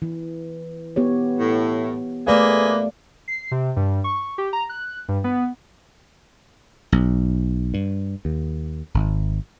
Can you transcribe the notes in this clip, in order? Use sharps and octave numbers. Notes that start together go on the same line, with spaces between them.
E3
B3 G4 C#5
A2
A3 A#3 G#4 B4 D5 F5
C7
C3
G2
C#6
G4
A#5
F#6
G2
B3
B1
G2
D#2
G#1